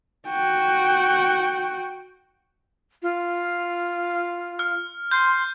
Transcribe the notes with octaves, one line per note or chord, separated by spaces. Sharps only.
F#4 G5
F4
F6
C6 G6